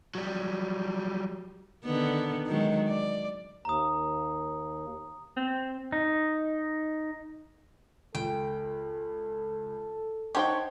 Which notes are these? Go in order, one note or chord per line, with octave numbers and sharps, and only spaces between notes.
F#3 G3
D3 D#3 B3
D#3 F#3 G#3
D5
D#2 A#5 D#6
C4
D#4
C#2 A4 G5
D#4 G4 C5 C#5 F#5 G5 A5